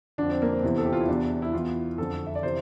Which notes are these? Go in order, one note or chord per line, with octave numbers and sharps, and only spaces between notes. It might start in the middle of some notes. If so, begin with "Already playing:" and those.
F2 D3 D4
C4
A#3
C4
E2 C3 E3
A4
G4
F4
E4
E2 C3 E3 D4
E4
E2 E3 F4
F2 D3 A4
E5
D5
C3 E3 C5